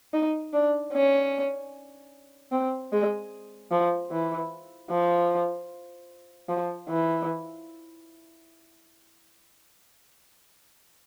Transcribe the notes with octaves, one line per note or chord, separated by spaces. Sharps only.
D#4
D4
C#4
C4
G#3
F3
E3
F3
F3
E3